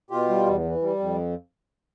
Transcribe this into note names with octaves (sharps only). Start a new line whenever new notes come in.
B2 F4 G4
G3
E2
E3
G3
F2